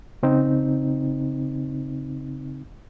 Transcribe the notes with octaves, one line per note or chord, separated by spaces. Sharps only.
C#3 C4 D#4